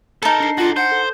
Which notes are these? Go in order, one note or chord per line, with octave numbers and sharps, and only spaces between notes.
D#4 A4 A#4 A5
D4 C7
F4 F#4 A4
C5 F#5 G6
A4